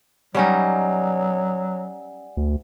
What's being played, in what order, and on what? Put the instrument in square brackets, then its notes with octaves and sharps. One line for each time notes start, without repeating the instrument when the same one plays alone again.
[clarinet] F#3 [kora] G3 C#4 D#4 [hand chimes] D5 F#5 G#5
[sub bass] D2